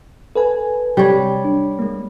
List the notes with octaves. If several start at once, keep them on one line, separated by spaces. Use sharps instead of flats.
A4 B4 G#5
C3 F#3 G3 C#5
D4
G#3 A#3